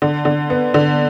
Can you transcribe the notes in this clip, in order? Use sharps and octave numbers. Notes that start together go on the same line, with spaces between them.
D3
D3
B3
D3